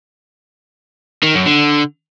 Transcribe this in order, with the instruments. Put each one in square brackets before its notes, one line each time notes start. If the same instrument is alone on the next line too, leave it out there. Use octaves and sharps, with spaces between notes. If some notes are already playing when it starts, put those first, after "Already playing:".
[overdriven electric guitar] D#3
F#2
D3